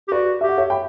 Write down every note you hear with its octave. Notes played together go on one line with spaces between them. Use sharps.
G4
F#4 B4 D5
G4 E5
F#5
C#5 E5
G5 B5